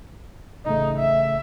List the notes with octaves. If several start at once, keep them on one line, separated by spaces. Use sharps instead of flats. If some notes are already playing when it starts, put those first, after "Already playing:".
A1 C#3 A3 D#4
E5